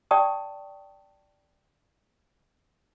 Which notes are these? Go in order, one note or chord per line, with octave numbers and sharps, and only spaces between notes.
D5 G5 A5 C#6 D#6